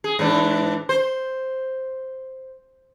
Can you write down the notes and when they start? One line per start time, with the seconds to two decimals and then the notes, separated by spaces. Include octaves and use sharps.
0.04 G#4
0.19 G#2 E3 D4
0.89 C5